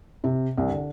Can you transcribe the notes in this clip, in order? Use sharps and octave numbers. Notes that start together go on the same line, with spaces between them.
C3
C2
D3